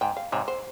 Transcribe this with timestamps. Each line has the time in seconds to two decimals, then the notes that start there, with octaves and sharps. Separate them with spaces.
0.01 G#2 G5
0.17 F5
0.32 G#2 C3 C#5
0.48 C5